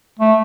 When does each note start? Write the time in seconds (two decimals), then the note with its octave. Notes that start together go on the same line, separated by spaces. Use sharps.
0.19 A3